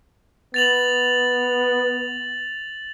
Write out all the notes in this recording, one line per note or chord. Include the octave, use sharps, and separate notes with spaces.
B3 A6 F7 F#7